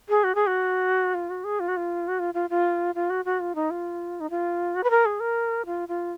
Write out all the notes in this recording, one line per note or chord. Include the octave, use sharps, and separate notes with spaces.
G#4
F#4
G#4
F#4
F4
F#4
G#4
F4
F#4
F4
F#4
F4
F4
F4
F4
F#4
F#4
F4
D#4
F4
D#4
F4
F#4
B4
A#4
G#4
A#4
F4
F4